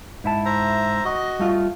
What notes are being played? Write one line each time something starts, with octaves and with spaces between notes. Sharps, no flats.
G#2 E4 A5
C5 E5 A#5
F#4 D#5
G3 A3 F4